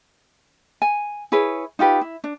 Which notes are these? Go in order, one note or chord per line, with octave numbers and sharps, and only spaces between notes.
G#5
E4 G#4 B4 C#5
D#4 F4 G4 B4
E4
D4